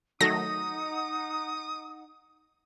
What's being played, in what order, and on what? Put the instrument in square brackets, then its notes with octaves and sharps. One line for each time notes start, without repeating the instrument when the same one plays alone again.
[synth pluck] D#3 F#3 A3 [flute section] D#4 F#5 [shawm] D#6 [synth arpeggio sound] A#6